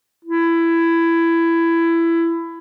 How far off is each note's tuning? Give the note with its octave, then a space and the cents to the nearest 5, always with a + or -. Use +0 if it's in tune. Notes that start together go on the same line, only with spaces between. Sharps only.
E4 +15